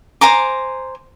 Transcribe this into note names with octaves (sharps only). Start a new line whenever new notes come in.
C5 G#5 A#5 D6